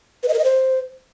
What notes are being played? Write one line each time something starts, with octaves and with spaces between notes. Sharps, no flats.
B4
D#5
A#4
D#5
C5